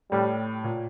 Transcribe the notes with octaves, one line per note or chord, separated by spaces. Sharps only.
A2 G3
A#2